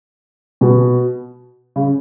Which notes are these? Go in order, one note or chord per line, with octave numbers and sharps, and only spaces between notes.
B2
C#3